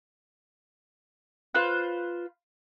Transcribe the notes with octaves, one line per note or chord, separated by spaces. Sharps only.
F4 B4 C5 F#6